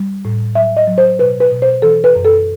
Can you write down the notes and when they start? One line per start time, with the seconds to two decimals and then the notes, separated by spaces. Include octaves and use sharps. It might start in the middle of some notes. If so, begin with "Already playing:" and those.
Already playing: G3
0.25 A2
0.55 F#3 E5
0.77 D#5
0.87 F#3
0.98 C5
1.19 B2 B4
1.40 B4
1.52 B2
1.62 C5
1.82 E3 A4
2.04 B4
2.15 F#2
2.25 A4